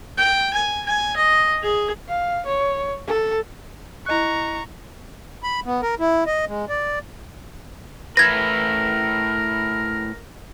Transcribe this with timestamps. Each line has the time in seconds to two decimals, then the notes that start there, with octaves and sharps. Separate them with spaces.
0.17 G5
0.53 G#5
0.86 G#5
1.16 D#5
1.62 G#4
2.08 F5
2.46 C#5
3.07 A4
4.06 E4 D#5 A#5 C#6 F#6
5.43 B5
5.66 B3
5.82 A#4
5.99 E4
6.26 D#5
6.48 G#3
6.69 D5
8.17 A2 E4 A#4 B4 G#6 A#6